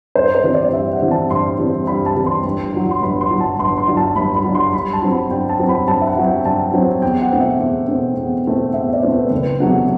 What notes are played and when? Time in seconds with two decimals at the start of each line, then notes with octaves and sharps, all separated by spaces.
0.15 G2 C5
0.35 C5
0.44 E3 G3 C4
0.54 D5
0.73 G2 E5
0.93 F#5
1.02 E3 G3 C4
1.11 A5
1.30 G2 C6
1.59 E3 G3 C4
1.87 G2 B5
2.06 A5
2.15 E3 G3 C4
2.26 C6
2.44 G1
2.73 G2 F#3
2.91 C6
3.02 G1 B5
3.21 C6
3.31 G2 F#3
3.41 A5
3.59 G1 C6
3.78 C6
3.88 G2 F#3
3.97 A5
4.16 G1 B5
4.36 B5
4.44 G2 F#3
4.55 C6
4.73 G2 B5
4.93 A5
5.02 F#3 C4
5.12 B5
5.31 G2 G5
5.49 A5
5.60 F#3 C4
5.69 B5
5.88 G2 A5
6.01 E5
6.07 F#5
6.17 F#3 C4
6.26 G5
6.45 G2 A5
6.74 F#3 C4
7.02 E2 G5
7.22 F#5
7.32 B2 A3 C4
7.40 E5
7.59 E2
7.88 B2 A3 C4
8.17 E2
8.46 B2 A3 C4
8.74 E2 E5
8.93 D5
9.03 B2 A3 C4
9.12 B4
9.31 F#1 B4
9.60 E2 C3 F#3 A3 F#5